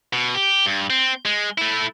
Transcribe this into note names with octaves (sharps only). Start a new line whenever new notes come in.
B2
G4
G2
C4
G#3
A3 E4